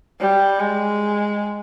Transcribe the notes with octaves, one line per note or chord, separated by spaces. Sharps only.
G3
G#3